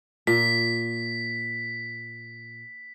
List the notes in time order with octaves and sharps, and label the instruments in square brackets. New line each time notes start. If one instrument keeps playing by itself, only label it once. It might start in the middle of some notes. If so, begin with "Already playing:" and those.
[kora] A#2 [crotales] B6